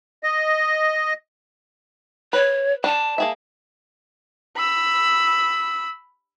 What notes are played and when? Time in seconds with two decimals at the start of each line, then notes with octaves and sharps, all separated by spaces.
0.23 D#5
2.33 B4 C#5
2.84 D4 A5
3.18 A#3 G#4 E5
4.57 B5 E6